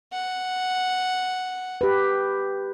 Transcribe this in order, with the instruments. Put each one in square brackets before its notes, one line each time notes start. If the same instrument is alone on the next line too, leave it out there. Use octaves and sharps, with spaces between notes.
[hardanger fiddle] F#5
[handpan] G4 B4